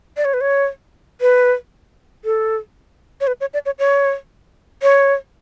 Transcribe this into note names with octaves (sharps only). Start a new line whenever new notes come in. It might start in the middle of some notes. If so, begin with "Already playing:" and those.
D5
C#5
B4
C#5
B4
A4
C#5
B4
C#5
D5
C#5
C#5
C#5